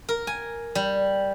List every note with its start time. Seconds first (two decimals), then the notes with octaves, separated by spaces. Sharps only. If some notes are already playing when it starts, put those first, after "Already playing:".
0.09 A#4
0.27 G#5
0.75 G3